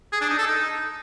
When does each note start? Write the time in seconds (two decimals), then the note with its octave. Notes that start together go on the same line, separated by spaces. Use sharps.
0.12 G#4
0.21 D4
0.30 D#4
0.38 A4
0.47 D#4